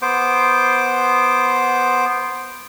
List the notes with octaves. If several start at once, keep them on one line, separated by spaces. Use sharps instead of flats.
B3 C5 D6